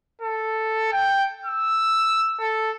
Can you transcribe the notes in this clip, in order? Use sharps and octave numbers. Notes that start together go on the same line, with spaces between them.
A4
G5
E6
A4